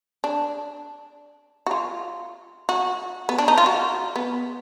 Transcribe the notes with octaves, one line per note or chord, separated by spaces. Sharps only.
D4
F#4
F4
F#4
B3
D4
D#4
F4
F#4
B3